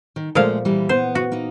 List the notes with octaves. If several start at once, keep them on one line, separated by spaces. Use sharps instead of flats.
D#3
A#2 F3 G#3 A3 F5
E3 G3 A#3
B3 C5
F#4
A#3 D#4